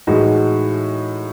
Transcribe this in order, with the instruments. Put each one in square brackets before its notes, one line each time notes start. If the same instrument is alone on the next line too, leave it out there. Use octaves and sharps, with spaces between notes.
[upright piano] A2 E3 G#3 D#4 F#4